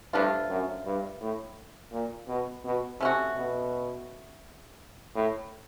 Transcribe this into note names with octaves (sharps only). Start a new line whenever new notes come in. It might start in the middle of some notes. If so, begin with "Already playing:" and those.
G2 F3 A3 D4 F4
F#2
G2
A2
A#2
B2
B2
C3 A3 C#4 F#4
B2
A2